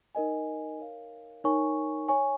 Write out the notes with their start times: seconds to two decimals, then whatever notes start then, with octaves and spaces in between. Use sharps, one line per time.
0.15 D#4 A#4 D#5 G#5
0.79 A#4 C#5 F5
1.44 D#4 A#4 C#5 G#5 C#6
2.08 C#5 G#5 C#6